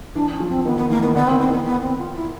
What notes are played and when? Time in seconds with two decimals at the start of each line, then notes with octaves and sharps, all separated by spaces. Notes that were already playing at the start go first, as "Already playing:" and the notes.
0.15 E3 D4
0.32 C#4
0.40 F3
0.49 C4
0.65 D#3 B3
0.77 D#3 B3
0.90 E3 A#3
1.03 D#3 B3
1.15 D3 B3
1.28 D#3 C4
1.40 D#3 C4
1.48 E3 B3
1.65 B3
1.82 C4
1.98 F4
2.15 E4